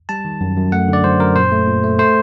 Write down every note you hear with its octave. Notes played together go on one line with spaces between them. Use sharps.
G3 A5
D#3
F#2
F#2
A3 F#5
D3 D5
F#2 C5
F#2 A#4
A#2 C5
A3
A#2
A3
A3 C5